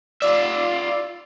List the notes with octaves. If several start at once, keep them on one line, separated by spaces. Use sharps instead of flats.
F4 D5 E5